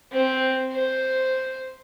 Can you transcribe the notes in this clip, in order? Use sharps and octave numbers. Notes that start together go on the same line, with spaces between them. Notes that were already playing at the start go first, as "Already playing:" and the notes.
C4
C5